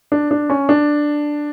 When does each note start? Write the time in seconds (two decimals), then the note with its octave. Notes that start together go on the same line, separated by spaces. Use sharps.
0.12 D4
0.31 D4
0.50 C#4
0.69 D4